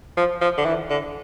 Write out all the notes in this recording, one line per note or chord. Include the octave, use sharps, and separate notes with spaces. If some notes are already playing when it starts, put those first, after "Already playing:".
F3
F3
D3
E3
D3